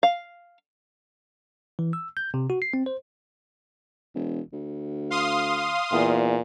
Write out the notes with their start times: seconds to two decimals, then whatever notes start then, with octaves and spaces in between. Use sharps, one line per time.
0.03 F5
1.79 E3
1.93 E6
2.17 G6
2.34 C3
2.50 F#4
2.62 C7
2.74 C4
2.86 C5
4.15 E1
4.53 D2
5.10 F5 C6 D#6
5.92 E2 A#2